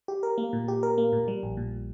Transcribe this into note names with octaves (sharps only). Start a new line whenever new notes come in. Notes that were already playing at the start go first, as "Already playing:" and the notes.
G4
A#4
A#3
A#2
G4
A#4
A#3
A#2
G3
A#1
A#2